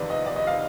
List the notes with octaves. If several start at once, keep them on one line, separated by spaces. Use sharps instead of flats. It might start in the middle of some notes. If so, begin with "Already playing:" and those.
Already playing: F2 C3 D#3 B4 D5
D#5
D5
D#5
F5